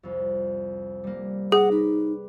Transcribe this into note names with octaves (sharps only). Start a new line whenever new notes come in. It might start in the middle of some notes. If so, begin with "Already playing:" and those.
C2 F2
G3 A#3
G#4 F#5 A#5 D6
D#4 B4